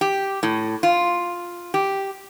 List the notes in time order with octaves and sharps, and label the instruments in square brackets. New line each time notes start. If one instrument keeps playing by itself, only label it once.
[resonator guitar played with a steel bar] G4
A2
F4
G4